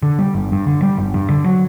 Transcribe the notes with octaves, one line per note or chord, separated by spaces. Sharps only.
D3
G3
G1
G2
D3
G3
G1
G2
D3
F#3